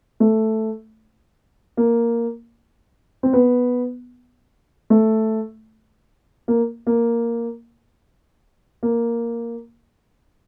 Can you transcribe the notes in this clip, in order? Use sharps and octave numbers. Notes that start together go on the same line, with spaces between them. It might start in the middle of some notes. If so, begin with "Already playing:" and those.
A3
A#3
C4
B3
A3
A#3
A#3
A#3